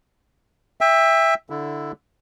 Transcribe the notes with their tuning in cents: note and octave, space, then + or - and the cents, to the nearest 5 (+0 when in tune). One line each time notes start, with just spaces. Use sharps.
E5 +0 G5 +35
D3 +0 E4 +0